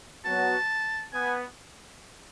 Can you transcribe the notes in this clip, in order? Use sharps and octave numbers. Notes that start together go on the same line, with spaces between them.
F#3 B3 F#4 A5
B3 G#5